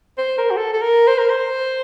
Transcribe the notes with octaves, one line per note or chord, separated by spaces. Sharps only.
C5
A#4
F#4
A4
A4
A#4
C5
A#4
C5